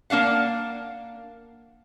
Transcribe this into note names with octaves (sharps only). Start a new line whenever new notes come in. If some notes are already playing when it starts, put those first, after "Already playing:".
A#3 D4 F5 F#5